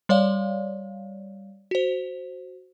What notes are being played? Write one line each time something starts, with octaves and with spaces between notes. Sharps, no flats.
G3 C#5 D5 F5
F#4 C5